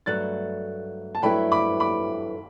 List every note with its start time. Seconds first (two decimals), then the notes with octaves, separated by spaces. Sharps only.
0.06 G2 F#3 A3 F#6 A6
1.15 A5
1.22 G2 F#3 A3 E4 B4 G5 B5
1.52 B5 D6
1.80 B5 D6